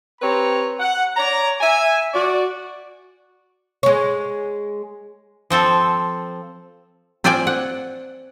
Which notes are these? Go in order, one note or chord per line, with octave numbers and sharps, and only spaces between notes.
C4 G4 B4 C#5 A#5
F#5
C#5 D5 A#5
E5 G#5
F#4 D5
G#3 C#5
F3 C4 A4
C4 F4 C5 D5 G5 G#5
F#5